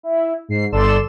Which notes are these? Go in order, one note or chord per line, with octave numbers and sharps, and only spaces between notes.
E4
G#2 C7
G1 A4 D5 C6 E6 E7